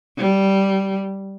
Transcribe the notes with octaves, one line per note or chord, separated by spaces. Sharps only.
G3